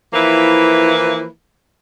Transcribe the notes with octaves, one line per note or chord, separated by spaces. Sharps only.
E3 F3 A#3 E4 B4